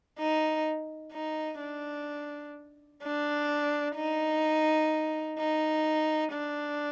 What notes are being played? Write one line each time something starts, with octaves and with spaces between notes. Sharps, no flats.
D#4
D#4
D4
D4
D#4
D#4
D4